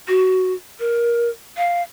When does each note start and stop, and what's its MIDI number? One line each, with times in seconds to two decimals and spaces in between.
0.08 0.53 66
0.79 1.29 70
1.57 1.82 77